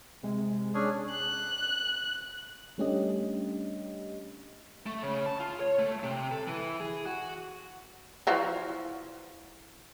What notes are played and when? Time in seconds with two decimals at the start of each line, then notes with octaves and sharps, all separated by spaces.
0.23 C3 G#3
0.74 C#4 D4 G#4
1.11 F#6
2.78 G3 A3 C#4 D4 G4 D#5
4.86 A3
5.03 C#3
5.26 A5
5.40 F4
5.60 C#5
5.79 A3
6.03 C3
6.32 A4
6.47 E3
6.80 G#4
7.06 F#4
8.27 E3 F3 F#4